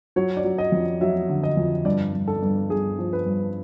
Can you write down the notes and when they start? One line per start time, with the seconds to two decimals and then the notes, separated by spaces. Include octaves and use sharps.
0.16 F#3 C#5
0.37 D5
0.44 F#3
0.58 D#5
0.72 F2
1.01 F#3 E5
1.29 D3
1.43 D#5
1.57 F2
1.85 G2 D5
2.14 G2
2.28 A4
2.42 G2
2.70 G2 G#4
2.98 F3
3.13 B4
3.26 G2